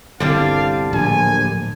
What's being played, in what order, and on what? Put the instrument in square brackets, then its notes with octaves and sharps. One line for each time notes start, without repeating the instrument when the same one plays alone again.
[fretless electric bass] G1 C2 [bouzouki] D3 G3 D4 [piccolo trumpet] F5
[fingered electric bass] D1 [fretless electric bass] A#1 [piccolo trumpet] G#5